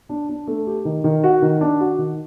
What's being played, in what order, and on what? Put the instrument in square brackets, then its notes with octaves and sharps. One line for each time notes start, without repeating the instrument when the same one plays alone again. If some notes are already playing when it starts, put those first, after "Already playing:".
[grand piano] D4
D4
A3
G4
D#3
D#3
F#4
D#3
D4
F#4
D#3